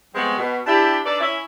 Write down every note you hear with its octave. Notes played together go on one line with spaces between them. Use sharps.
F3 G3 G#3 B3 C4 F#4
B2
D4 E4 G4
D4 D#4 A4 B4 D5
C#4 E4